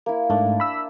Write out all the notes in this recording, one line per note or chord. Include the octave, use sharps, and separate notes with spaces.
A#3 E4
G#2 A3 D4
B5 E6